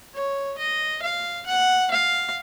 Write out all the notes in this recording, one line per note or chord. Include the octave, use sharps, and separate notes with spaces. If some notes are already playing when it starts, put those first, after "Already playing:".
C#5
D#5
F5
F#5
F5